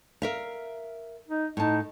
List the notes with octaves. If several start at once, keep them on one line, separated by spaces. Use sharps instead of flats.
A#4 E5 F5
D#4
A2 D#4 A5